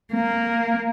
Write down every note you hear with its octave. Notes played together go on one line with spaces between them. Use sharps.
A#3